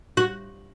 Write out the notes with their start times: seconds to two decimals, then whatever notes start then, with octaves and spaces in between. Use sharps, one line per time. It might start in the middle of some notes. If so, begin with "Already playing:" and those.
0.17 F#4